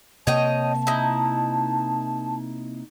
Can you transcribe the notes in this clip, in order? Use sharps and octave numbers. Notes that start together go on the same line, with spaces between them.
C3 A#3 C#5 D#5 G5 A5
D#4 E4